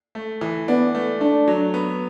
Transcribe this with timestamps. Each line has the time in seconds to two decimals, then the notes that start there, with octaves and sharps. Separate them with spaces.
0.15 A3
0.41 E3
0.68 B3 D4
0.95 A3
1.21 A3 D4
1.48 F#3
1.74 B3